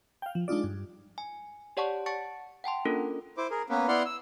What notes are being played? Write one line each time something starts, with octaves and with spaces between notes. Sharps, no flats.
F5 G5
F3
G#3 D4 D#4 F4 D5
G2
G#5
G4 C#5 D5 F#5 A5 C#6
F#5 A5 C#6 A6 C#7
F#5 G5 A5 C6
A#3 C#4 D4 F4 A4 A#4
E4 C5 D6
G#4 A#4
A#3 B3 C#4 B4
B3 E4 D5 F#5 C6 F6
E6